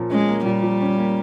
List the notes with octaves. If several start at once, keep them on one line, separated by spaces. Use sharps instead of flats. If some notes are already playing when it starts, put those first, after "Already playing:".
Already playing: A#2 F3 A#3 C#4
G#3 C#4
A#3
A#2 G3
F3
C#4
A#3